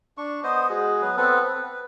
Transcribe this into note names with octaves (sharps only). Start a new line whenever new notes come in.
D4 C#6
B3 C5 D#5
G#3 F#4 G#4
F#3 B3 B4
B3 C4 A4 B4
B4